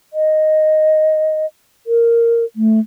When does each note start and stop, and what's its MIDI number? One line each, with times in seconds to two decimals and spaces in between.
0.13 1.46 75
1.87 2.45 70
2.56 2.79 57